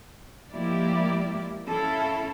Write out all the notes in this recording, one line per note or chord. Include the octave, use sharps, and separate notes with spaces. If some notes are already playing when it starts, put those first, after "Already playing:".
F3 G#3 A#3 E4 G4 D5
C#4 E4 A4 F5